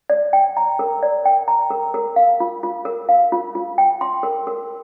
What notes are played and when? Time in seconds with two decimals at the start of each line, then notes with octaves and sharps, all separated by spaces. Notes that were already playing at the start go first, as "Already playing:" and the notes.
0.10 D5
0.33 G5
0.57 A#5
0.79 A#4
1.03 D5
1.25 G5
1.48 A#5
1.70 A#4
1.94 A#4
2.16 F5
2.40 F4
2.63 F4
2.85 A#4
3.09 F5
3.32 F4
3.55 F4
3.78 G5
4.01 C6
4.23 A#4
4.47 A#4